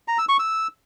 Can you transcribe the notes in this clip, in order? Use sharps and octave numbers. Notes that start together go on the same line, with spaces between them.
A#5
E6
C#6
E6